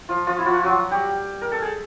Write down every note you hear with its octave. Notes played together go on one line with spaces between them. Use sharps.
F3 F4
F3 F4
E4
F3 F4
F#3 F#4
G3 G4
A#4
A4
G#4